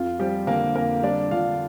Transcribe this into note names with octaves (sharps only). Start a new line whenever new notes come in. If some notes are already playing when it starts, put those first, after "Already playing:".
Already playing: F2 F4
F3 G3 G4
D3 A#3 A#4
F2 A#3 A#4
G3 D4 D5
D3 F4 F5